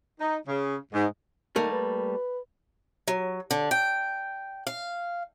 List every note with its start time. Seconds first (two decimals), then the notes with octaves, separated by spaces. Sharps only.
0.20 D#4
0.46 C#3
0.93 G#2
1.56 D#3 G3 A3 A#3
1.72 B4
3.07 F#3
3.51 D3
3.71 G5
4.67 F5